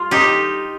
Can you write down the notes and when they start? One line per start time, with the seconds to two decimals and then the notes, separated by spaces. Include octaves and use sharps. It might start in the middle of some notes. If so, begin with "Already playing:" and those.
Already playing: G3 F4
0.11 D#4 G4